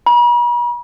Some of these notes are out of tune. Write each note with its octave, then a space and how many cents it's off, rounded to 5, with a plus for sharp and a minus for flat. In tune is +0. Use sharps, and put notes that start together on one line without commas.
B5 -45